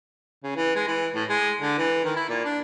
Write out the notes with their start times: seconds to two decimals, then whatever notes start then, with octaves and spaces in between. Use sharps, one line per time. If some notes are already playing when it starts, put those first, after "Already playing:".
0.43 C#3
0.56 E3
0.76 G#3
0.87 E3
1.15 A2
1.29 G#3
1.61 D3
1.78 E3
2.04 D#3
2.16 E4
2.29 A#2
2.45 D4